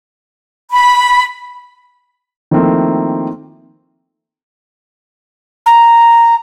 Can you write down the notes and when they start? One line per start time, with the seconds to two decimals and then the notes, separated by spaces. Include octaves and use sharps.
0.71 B5
2.51 D#3 F3 A3 A#3 C4 E4
5.66 A#5